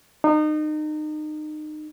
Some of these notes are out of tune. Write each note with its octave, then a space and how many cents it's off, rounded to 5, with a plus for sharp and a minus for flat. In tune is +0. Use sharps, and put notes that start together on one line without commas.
D#4 -30